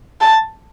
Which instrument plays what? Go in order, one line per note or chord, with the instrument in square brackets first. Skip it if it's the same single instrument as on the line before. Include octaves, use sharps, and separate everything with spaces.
[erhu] A5